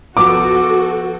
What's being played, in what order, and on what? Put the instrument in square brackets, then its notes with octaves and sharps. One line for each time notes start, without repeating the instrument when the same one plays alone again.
[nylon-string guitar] F3 B3 [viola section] F#4 A4 [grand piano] D6